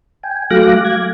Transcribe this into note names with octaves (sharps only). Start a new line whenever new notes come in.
G5 G#5
F#3 A3 F5 D6 F#6 A#6
G#6